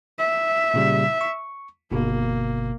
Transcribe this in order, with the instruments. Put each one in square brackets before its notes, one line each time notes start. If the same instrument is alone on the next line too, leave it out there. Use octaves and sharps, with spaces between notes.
[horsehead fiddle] E5
[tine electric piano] A#2 C#3 G3
C#6
[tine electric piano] G1 B2 [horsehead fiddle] A#3